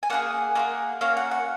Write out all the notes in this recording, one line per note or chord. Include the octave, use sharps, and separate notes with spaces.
G#5
A#3 F4 G#4 F#5
A#3 F4 G#4 F#5
A#3 C#4 F#4 F5
F#5
F#5